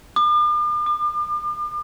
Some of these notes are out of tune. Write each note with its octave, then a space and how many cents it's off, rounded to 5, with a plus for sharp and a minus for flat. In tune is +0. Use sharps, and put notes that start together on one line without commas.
D6 +45
D6 +35